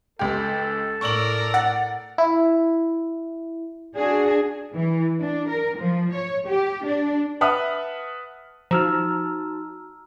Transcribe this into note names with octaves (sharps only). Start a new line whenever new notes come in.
C#2 G4 A4
A2 A#4 D5 C#6 E6 F#7
F#5 A6
E4
D4 F#4 G#4
E3
D4
A#4
F3
C#5
G4
D4
B4 E5 F#5 A5 D#6 F6
F3 D#4 F#4 A5 A#5 E6 F6